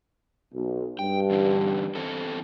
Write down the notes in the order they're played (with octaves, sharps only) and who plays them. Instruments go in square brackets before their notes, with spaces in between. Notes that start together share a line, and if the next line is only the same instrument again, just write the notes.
[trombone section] B1
[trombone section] G2 [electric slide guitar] G5
[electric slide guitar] E2 D3 E3
E2 C4 A4